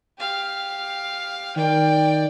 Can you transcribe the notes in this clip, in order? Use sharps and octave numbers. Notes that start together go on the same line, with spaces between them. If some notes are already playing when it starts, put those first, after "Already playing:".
G4 F5
D#3 D5 G5